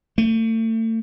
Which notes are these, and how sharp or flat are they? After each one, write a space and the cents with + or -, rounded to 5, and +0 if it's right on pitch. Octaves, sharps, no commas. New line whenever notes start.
A3 +35